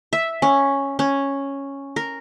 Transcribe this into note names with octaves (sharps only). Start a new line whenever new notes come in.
E5
C#4
C#4
A#4